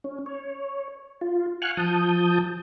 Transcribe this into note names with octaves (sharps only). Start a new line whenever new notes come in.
C#4
C#5
F4
F5 F#5 G#5 C#6 F6 F#6
F3 A5 D#6 G6